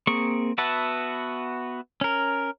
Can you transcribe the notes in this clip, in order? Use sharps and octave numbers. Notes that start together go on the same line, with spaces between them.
A#3 C4 G#4 C#6
B3 F#4 B4 E5 A5
C#4 A#4